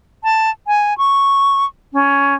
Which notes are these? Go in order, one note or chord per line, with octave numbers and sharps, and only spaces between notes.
A5
G#5
C#6
C#4